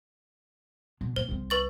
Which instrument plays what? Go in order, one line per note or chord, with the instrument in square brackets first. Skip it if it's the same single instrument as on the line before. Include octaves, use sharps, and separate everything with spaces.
[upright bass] B2
[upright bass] A#2 [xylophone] C5
[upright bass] C2 C4
[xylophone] B4 C#6 A6